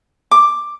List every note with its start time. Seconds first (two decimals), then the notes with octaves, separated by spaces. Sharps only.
0.31 D6